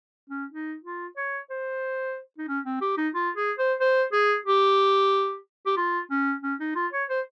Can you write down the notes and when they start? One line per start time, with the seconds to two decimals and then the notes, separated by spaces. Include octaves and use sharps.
0.30 C#4
0.52 D#4
0.84 F4
1.17 C#5
1.50 C5
2.38 D#4
2.48 C#4
2.66 C4
2.81 G4
2.97 D#4
3.15 F4
3.36 G#4
3.58 C5
3.80 C5
4.12 G#4
4.46 G4
5.66 G4
5.77 F4
6.10 C#4
6.43 C#4
6.60 D#4
6.75 F4
6.93 C#5
7.09 C5